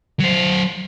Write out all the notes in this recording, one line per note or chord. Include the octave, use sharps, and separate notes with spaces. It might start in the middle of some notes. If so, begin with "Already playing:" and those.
F#3 C5